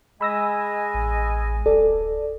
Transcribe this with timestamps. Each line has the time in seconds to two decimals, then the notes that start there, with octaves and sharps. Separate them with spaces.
0.21 G#3 D#5 G#5 B5 E6 A#6
0.94 A1
1.66 D1 A4 D5